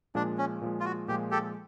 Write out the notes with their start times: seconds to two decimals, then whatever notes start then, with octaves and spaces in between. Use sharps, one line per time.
0.15 A#2 F3 G#3 D4
0.38 C#4
0.62 A#2 F3 G#3
0.80 F4
0.85 F#4
1.08 A#2 F3 G#3 G4
1.31 G4 A4